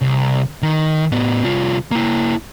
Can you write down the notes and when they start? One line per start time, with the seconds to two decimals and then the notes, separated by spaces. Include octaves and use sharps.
0.01 C2
0.62 D#3
1.12 A2 B3
1.44 C2 F4
1.92 A#3 E4